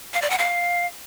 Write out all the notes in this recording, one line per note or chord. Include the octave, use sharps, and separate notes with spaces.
F5
D5
F#5
F5